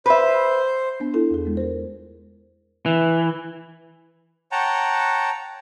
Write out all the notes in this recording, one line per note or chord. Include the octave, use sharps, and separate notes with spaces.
B4 C5 E5
B3 D4
E4 F4 A4
E2 G#4
G#3 B3
A#4 C5
E3
C#5 F#5 G5 A5 A#5